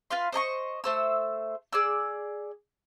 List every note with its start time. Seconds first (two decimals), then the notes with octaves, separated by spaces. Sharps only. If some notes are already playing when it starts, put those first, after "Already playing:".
0.11 F4 B4 F5 C6
0.32 C5 D#5 A#5 C#6
0.84 A3 C5 E6
1.73 G#4 D5 E6